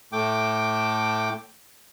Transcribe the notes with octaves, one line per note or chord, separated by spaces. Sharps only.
A2 A3 G5 D6